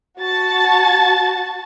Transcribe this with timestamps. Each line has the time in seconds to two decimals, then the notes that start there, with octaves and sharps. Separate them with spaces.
0.21 F#4 A5 A6